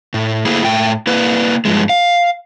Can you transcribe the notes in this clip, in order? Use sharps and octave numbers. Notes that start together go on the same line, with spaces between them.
A2
A3 A#3 E4 G#4
A2 G5
A#3 E4 B4
G2 F3 G#3
F5